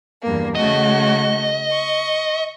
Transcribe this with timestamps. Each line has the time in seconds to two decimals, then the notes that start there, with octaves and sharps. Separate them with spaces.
0.22 E2 G2 A#3
0.55 C#3 A3 F#4 D#5
1.71 C#6